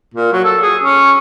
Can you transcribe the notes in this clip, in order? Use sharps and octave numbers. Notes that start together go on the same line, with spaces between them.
A#2
F#3
A4
G#4
C#4